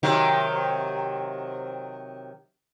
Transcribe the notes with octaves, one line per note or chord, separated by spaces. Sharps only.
C3 D#3 F#3